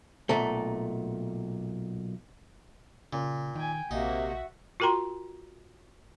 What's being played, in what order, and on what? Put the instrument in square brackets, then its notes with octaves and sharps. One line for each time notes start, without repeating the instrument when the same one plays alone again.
[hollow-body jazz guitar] B1 A#2 A3
[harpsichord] A#2 [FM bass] C#3
[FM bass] D#3 [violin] G5 G#5
[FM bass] A#1 [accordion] C3 A#3 [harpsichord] D#4 [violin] F#4 E5
[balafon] F4 F#4 A#4 G5 A#5 C6